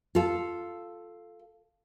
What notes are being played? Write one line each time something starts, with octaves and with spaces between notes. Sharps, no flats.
F4 A4